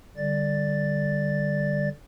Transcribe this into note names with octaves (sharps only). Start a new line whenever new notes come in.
D3 G3 D5 A6